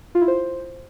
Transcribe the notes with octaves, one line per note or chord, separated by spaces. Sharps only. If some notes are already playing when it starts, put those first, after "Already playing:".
F4
E4
C5